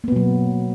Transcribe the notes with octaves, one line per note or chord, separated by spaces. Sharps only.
B2 F#3 A#3 B3